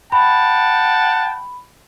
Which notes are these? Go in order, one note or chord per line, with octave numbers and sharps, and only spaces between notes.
F#5 G5 A5 B5